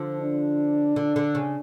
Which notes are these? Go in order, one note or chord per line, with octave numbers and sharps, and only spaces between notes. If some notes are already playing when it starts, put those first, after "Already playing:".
Already playing: D3 F3
D4
D3
D3
C#3